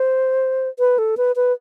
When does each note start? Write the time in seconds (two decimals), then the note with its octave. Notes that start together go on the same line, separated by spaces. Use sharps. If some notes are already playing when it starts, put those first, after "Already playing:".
Already playing: C5
0.79 B4
0.98 A4
1.17 B4
1.36 B4